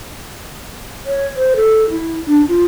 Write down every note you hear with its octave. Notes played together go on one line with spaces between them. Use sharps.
C#5
C5
A4
E4
D4
F4